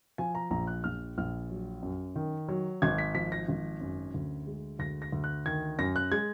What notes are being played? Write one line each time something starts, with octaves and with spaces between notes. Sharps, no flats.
F3 G#5
A#5
A#1 A#5
F#6
A#1 F6
A#1 F6
F#3
F#2
D#3
F#3
G#1 G#6
B6
F3 B6
A#6
G#1
F#2
D2
G#3
D2 A#6
A#6
D2
F#6
D#3 G#6
F#2 A#6
F#6
G#3 G#6